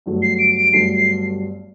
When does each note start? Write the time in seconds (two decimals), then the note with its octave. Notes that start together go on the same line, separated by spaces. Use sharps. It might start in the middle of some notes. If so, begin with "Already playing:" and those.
0.06 G1 G2 F#3 A3
0.22 C7
0.39 D7
0.57 D7
0.73 G1 G2 F#3 A3 C7
0.95 C7